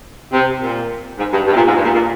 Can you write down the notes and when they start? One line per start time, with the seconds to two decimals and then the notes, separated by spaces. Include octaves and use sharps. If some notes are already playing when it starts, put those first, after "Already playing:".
0.32 C3
0.61 A#2
1.18 G#2
1.32 G2
1.47 G2
1.52 C3
1.56 A#2
1.66 G#2
1.75 G2
1.84 A#2
1.95 A#2